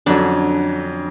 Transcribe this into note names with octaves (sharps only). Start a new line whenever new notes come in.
F2 D3 F#3 C#4 D4